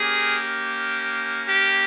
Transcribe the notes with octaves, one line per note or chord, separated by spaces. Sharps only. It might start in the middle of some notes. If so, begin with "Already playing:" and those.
Already playing: A#3 C#4 G4 G#4
G4